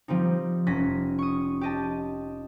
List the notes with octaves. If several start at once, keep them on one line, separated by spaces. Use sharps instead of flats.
F3 G3 C4 D#4
F1 C#4 A#6 B6
C#6 D#6
G4 D#5 A5